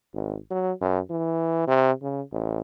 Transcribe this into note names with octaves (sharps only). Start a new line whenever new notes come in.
G#1
F#3
F#2
E3
C3
C#3
A1